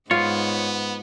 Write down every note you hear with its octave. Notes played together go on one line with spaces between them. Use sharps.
G#2 B3 F4 C#5